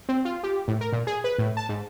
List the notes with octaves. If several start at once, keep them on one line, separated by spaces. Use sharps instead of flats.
C4
F4
G4
A2
A#4
A#2
G#4
B4
A2
A5
G#2